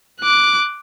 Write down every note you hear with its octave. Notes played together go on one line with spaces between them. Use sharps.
D6 F#6